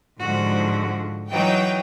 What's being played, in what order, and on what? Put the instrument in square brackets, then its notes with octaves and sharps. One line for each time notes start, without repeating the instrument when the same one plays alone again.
[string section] G#2 D3 F3 [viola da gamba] F#4
[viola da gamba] E3 F#3 D#4 [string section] G5